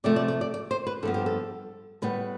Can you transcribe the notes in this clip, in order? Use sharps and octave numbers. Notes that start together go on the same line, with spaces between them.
C3 F3 A3 D5
D5
D5
D5
D5
C5
B4
G2 F3 B3 A4
G4
A4
A2 G3 B3 B4